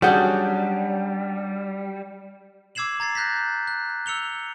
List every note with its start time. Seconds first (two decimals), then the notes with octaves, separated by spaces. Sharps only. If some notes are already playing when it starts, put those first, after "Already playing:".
0.02 F#3 G3 C#4 D4 G#4 F#5 G6
2.75 D6 E6 G#6 C7 E7 F#7
3.00 A#5 G#6 A6 C7
3.15 F#6 G6 A#6 B6
3.67 F#6
4.06 E6 C#7 F7 G7